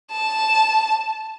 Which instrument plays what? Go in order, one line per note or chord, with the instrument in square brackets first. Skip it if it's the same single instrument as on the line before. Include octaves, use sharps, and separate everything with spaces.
[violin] A5